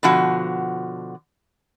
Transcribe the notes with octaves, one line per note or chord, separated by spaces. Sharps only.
B2 D3 F3 F#4